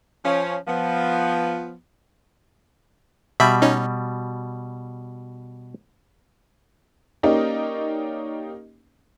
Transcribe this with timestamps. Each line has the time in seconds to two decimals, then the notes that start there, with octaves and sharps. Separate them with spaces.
0.24 F3 C#4
0.67 F3 B3
3.40 B2 G3 E5 B5
3.62 C#4 D#4
7.23 A#3 C#4 D#4 G4 D5 D#5